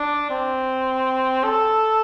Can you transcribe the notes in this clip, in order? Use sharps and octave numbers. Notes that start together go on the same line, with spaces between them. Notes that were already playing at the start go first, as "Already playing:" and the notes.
Already playing: D4
C4
A4